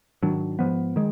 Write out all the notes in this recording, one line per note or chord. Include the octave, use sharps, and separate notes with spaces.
G#2 D#3 F#3 D4
G#2 F3 B3
D#3 G#3